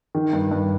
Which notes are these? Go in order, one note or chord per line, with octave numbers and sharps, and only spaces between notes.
D#3
G2
G2